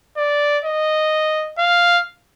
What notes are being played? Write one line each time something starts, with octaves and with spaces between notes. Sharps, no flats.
D5
D#5
F5